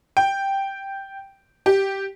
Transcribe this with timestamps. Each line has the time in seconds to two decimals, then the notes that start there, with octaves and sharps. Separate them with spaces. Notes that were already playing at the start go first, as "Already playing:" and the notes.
0.17 G5
1.66 G4